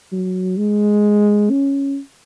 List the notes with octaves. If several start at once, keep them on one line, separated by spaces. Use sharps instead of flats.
F#3
G#3
C#4